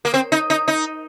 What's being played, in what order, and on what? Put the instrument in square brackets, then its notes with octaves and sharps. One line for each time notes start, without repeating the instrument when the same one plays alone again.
[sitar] A#3
C4
D#4
D#4
D#4